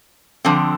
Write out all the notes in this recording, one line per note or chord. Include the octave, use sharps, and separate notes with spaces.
D3 F3 C4